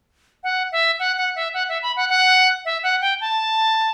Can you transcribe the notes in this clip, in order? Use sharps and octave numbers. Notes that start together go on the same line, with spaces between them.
F#5
E5
F#5
F#5
E5
F#5
E5
B5
F#5
F#5
E5
F#5
G5
A5